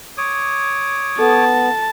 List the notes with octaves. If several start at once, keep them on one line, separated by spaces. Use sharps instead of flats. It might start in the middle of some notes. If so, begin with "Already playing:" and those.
C#5 D6 D#6
B3 A4 A5